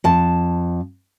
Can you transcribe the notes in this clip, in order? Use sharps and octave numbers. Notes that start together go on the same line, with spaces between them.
F2 A5